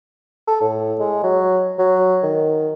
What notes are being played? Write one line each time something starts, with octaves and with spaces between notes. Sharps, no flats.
A4
A2
G#3
F#3
F#3
D#3